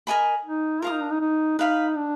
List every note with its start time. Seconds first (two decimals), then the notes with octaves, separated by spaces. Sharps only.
0.07 A#4 D#5 G#5 B5
0.45 D#4
0.82 F4 A#4 F5 A#5 D#6
0.92 D#4
1.01 D4
1.11 D#4
1.21 D#4
1.59 D#4 B4 F5 B5
1.97 D4